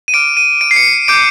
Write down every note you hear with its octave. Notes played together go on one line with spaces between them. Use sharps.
D#7
D6 F6 D7
D#7
D7
C7
C#7
D6 G6 D7